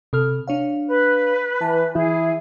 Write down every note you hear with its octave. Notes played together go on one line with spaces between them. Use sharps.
C3 A4 F6
D4 C#5 F5
B4
E3 A5
E3 E4 G#4